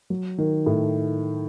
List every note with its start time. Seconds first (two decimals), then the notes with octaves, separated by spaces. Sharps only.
0.10 F#3
0.38 D#3
0.66 A2